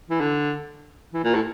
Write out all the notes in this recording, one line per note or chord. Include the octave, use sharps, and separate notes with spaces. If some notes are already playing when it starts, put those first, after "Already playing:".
E3
D3
E3
A#2
A2